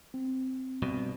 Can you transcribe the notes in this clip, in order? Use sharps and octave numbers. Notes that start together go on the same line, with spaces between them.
C4
C2 G2 B2